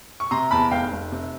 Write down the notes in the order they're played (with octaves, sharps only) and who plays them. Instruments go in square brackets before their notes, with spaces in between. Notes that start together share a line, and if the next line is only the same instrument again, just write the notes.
[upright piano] C#6
C3 A#5 C6
E2 A5 B5
F1 F5 G5
F1
C3